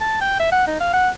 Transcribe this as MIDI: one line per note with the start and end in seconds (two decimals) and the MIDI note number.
0.01 0.20 81
0.21 0.39 79
0.40 0.50 76
0.52 0.66 78
0.67 0.80 63
0.80 0.92 77
0.93 1.09 78